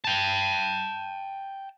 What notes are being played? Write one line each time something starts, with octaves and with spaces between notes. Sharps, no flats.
G5 A5